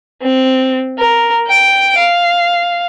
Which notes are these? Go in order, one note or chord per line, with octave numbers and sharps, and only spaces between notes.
C4
A#4
G5 D7
F5